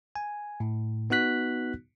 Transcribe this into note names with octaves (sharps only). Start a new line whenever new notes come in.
G#5
A2
B3 D#4 F#4 F#6 B6